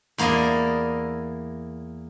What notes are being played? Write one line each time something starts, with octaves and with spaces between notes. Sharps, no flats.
E2 A#3 E4 D5 D#5